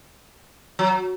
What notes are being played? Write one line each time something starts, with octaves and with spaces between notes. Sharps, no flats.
F#3